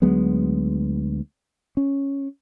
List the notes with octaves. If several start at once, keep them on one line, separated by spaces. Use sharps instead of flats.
D2 F#3 G#3 B3
C#4